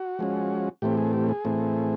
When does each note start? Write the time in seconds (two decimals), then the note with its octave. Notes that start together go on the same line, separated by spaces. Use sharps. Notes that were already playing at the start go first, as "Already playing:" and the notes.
Already playing: F#4
0.19 F3 G#3 C#4
0.82 A2 E3 A3 C4 G4
0.97 G#4
1.13 G4
1.29 G#4
1.45 A2 E3 A3 C4